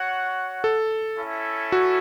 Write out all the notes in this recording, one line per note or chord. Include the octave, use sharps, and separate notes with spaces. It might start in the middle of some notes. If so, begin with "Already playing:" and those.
Already playing: F#4 C#5 F#5
A4
C#4 E4 A4 E5
F#4